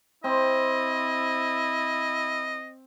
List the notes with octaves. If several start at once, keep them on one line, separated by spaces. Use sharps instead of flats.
C4 E4 D#5